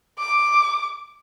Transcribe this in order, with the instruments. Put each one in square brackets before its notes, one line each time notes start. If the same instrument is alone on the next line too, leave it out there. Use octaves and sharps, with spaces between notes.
[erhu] D6